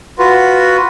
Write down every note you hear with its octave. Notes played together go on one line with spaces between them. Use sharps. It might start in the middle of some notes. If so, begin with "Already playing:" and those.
F4 F#4 B4